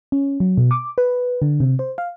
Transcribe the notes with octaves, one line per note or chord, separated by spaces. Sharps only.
C#4
F#3
B2
D6
B4
D3
C3
C5
F5